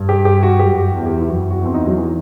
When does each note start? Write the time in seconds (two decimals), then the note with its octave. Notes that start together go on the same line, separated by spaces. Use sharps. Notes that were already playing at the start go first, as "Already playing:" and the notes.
Already playing: G2
0.09 G4
0.25 G4
0.43 F#4
0.59 F#2 G4
0.94 E2
1.06 G4
1.21 E4
1.28 F#2 F#4
1.51 F#4
1.62 E2 C4
1.74 D#4
1.87 F#3
1.97 E3